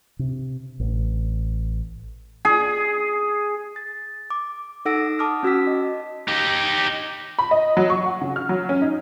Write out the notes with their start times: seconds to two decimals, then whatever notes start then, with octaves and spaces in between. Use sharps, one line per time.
0.19 C3
0.80 A1
2.45 G#4
3.76 A6
4.30 D6
4.85 D#4 A4 F#5 E6 A#6 D7
5.19 A5 D6 D#6 F6
5.43 C#4 F#4 E6 B6
5.67 D#5
6.28 D#4 G4
7.39 B5
7.51 D#5
7.77 F#3
7.90 C#6
8.06 F#5
8.21 C#3
8.36 F6
8.49 F#3
8.69 C#4
8.82 D#4